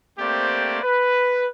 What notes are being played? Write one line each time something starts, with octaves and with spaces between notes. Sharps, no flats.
A3 A#3 C4 G4 C5 D5
B4